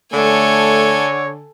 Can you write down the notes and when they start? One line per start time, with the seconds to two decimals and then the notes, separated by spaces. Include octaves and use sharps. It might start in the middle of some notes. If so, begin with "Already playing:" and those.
0.13 D3 A3 A4 C#5 G#5